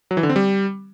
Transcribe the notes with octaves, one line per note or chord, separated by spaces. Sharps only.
F#3
E3
D3
C4
G3